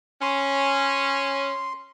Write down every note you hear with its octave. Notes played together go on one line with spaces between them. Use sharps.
C#4 C6